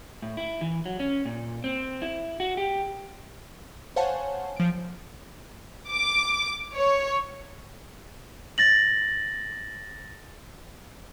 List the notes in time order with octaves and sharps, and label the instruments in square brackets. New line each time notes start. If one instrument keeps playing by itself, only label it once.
[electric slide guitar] A2
E4
E3
F#3
C#4
A#2
C4
E4
F#4
G4
[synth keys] C5 C#5 F5 F#5 G#5 A5
F3 D7
[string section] D6
C#5
[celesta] A6 A#6 F#7